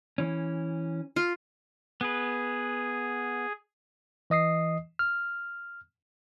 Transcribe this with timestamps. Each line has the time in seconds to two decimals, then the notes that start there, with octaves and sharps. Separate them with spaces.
0.18 E3 C#4
1.16 F4
2.01 B3 G#4 B4
4.30 E3 D#5 D#6 C7
4.99 F6